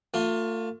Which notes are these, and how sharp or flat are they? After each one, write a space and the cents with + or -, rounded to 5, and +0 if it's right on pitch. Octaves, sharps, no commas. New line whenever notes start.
A3 +40 F4 +20